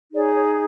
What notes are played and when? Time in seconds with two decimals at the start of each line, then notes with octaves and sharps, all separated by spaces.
0.12 D#4 G#4 C#5 D5
0.34 C#5